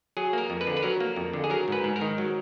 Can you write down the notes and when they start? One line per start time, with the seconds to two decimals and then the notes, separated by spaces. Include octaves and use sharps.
0.17 F#3 G#4
0.33 A#3 A#4
0.50 F2
0.61 B4
0.67 D3
0.77 B4
0.83 F#3 A#4
1.00 A#3
1.16 F2
1.34 D3
1.44 G#4
1.50 F#3 A#4
1.68 G#2 B4
1.84 G#2
1.96 A#4
2.01 D#3
2.18 F#3